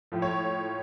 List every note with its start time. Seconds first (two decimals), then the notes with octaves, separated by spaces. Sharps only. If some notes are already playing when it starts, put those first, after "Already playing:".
0.12 A2 F3
0.22 C#5